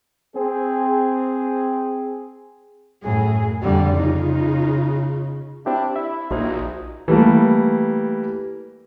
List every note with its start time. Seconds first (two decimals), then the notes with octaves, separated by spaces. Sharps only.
0.36 C4 G#4
3.03 F#2 A2 G#4
3.62 F2 D3 G3 D5
3.97 C#3 D#4 F4
5.66 C4 D4 E4 G4
5.96 E4 E5
6.31 A#1 D#4 F#4 C5 D5
7.08 E3 G3 A3 A#3